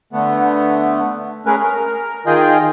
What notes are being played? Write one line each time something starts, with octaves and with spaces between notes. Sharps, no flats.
D3 A3 B3
G#3 A3 C#4 G#4 A#4 B4
A#4
D#3 F4 G#4 D#5 G5